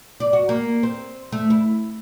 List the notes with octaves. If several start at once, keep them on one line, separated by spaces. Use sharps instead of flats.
D5
F#4
A#3
C4
A3
E4